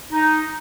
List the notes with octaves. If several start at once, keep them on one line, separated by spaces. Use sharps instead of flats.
D#4